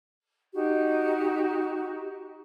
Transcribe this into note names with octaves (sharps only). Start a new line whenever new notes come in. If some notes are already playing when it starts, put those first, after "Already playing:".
D#4 F#4 G4